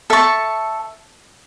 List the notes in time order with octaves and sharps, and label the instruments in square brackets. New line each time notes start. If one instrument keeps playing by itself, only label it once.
[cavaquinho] A4 E5 A5 C#6